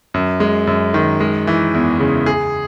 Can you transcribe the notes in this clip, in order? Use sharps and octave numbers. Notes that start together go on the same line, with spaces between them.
F#2
G#3
F#2
D#3
G#3
E3
E2
C#3
G#4